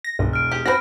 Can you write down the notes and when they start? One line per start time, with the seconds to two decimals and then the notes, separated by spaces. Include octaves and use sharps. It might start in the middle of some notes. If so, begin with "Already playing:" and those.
0.04 A#6
0.19 E1 C2 G2
0.33 F6 D7
0.51 G4 G#4
0.65 C4 F#4 A4 C5 B5 A#6